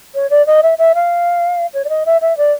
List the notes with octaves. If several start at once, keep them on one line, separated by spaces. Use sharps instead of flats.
C#5
D5
D#5
E5
E5
F5
C#5
D5
D#5
E5
E5
D5